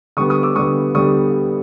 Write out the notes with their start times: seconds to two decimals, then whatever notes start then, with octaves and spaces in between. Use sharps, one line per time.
0.17 D3 G3 B3 C#6 D#6
0.30 C#6 D#6
0.43 D6 E6
0.55 D3 G3 B3 C#6 D#6
0.95 D3 G3 B3 C#6 D#6